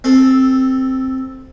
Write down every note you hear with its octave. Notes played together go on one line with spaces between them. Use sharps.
C4 A4